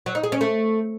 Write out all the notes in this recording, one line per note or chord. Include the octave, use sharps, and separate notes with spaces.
F#3
D#4
G#4
C#4
A3